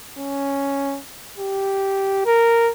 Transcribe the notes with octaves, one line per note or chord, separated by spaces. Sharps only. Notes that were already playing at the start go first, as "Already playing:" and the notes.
C#4
G4
A#4